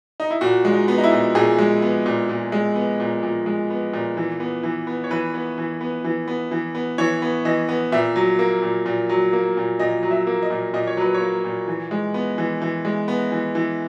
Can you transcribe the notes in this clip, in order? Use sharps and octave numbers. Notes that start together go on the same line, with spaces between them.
D#4
E4
A#2 F#4
G#3
D#4
B3
D#4
E4
A#2
A#2 G#4
G#3
B3
A#2
A#2
G#3
B3
A#2
A#2
G#3
B3
A#2
E3
B3
E3
B3
C#5
E3 B4
B3
E3
B3
E3
B3
E3
B3
E3 C#5
B3
E3 D#5
B3
A#2 E5
F#3
A#3
A#2
A#2
F#3
A#3
A#2
A#2 D#5
F#3
E5
A#3
D#5
A#2
A#2 D#5
C#5
F#3 B4
C#5
A#3
A#2
E3
G#3
B3
E3
E3
G#3
B3
E3
E3